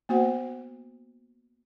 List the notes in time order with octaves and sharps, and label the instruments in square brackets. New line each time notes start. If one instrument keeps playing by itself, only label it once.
[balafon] A#3 B3 F#4 C5 F#5